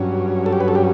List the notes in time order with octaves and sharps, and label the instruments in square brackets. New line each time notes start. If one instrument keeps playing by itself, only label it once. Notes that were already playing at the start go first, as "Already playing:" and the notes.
Already playing: [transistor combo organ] G2 F#3 C#4
A4
G4
B4
A4
G4